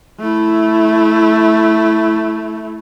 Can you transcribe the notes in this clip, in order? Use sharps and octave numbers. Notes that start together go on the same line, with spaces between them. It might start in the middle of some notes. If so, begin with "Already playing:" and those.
A3 E4